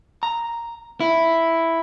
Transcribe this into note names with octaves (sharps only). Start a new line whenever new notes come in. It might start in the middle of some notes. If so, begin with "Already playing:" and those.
A#5
E4